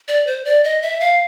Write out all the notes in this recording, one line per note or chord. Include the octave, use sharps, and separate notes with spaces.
D5
C5
D5
D#5
E5
F5